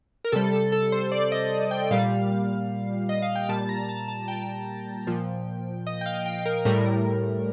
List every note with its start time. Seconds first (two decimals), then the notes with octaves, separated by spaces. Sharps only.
0.25 A#4
0.32 C3 G3 A4
0.53 A4
0.72 A4
0.92 C5
1.12 D5
1.32 D#5
1.71 G5
1.91 A#2 G3 F5
3.09 D#5
3.22 F5
3.36 G5
3.49 A#2 G3 A5
3.69 A#5
3.89 A5
4.08 A5
4.28 G5
5.07 A#2 F3
5.87 D#5
6.01 G5
6.06 F5
6.26 G5
6.45 A#4
6.65 A2 G3 A#4